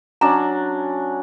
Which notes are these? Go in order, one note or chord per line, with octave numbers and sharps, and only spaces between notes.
F#3 C#4 D4 A#5